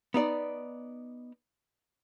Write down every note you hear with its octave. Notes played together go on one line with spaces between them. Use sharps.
B3 D#4 D5